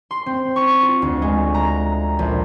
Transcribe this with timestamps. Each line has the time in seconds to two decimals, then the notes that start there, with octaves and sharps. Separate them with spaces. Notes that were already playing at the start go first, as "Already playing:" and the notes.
0.11 C6
0.26 C4
0.56 C#6
0.82 F4
1.02 D2
1.22 G#3
1.54 A#5
2.19 A#1